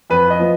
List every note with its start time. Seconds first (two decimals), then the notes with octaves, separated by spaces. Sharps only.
0.10 F2 B4
0.30 D#5
0.39 F3 B3